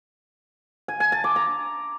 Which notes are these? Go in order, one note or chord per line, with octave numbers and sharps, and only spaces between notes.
G#5
G#5
A5
D6
A#5